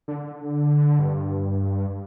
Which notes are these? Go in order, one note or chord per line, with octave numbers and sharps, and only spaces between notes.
D3
G2